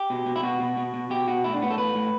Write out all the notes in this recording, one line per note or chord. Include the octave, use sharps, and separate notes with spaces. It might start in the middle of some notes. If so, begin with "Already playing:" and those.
Already playing: G4
B2
B2
E4
B2 F#4
B2
B2
B2
B2 G4
B2 F#4
A2 E4
D4
A2 B3
A4
A2 B4
A2